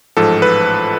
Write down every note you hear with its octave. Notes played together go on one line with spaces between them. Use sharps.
A1 G#2 F3 A4
B4